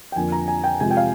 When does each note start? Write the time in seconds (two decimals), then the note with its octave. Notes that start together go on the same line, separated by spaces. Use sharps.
0.12 G5
0.16 F2 D3 F3 A#3 G#5
0.32 A#5
0.48 G#5
0.64 G5
0.80 C3 F3 G#3 G#5
0.91 G5
0.97 F5